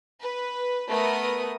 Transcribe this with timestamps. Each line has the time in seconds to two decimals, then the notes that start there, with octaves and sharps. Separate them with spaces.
0.22 B4
0.89 A3 B3 A#4 B4 D#6